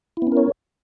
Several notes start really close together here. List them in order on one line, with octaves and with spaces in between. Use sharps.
E4 B3 C#4 A#4 C#5